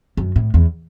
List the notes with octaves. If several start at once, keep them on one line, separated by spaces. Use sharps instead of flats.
F#2
A2
E2